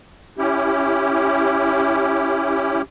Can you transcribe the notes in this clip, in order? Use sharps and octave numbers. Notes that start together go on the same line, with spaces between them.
C#4 E4 G4